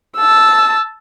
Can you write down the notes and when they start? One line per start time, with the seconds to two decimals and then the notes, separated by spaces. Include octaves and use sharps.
0.17 A5 E6